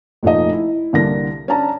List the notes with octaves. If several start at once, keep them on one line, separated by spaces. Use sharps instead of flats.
F1 A#2 A3 D#4 D#5
E4
C2 D3 A#3 A#6
C#4 D4 C#5 A5 A#5